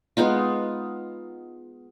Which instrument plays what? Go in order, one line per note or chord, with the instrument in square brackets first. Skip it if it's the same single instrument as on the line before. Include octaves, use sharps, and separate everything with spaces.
[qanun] G#3 B3 D#4 F4